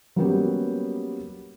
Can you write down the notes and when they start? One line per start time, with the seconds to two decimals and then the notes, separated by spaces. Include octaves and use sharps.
0.16 F#3 G3 A#3 B3 C#4 G4